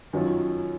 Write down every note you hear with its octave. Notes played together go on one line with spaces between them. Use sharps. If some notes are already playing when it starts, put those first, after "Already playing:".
F#2 D#3 F#3 C#4 F4